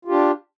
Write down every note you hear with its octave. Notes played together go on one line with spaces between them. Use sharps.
D4 F4 G4